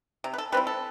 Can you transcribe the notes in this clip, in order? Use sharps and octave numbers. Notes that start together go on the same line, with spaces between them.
C3
B4
A4
G3 C4 E4 B4
A4